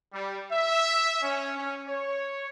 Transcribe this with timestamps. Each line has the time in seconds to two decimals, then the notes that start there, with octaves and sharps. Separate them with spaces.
0.13 G3
0.51 E5
1.22 C#4
1.57 C#4
1.87 C#5